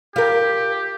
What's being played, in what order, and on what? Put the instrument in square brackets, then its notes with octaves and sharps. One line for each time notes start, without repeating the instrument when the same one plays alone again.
[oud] F4 A#4 [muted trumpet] G4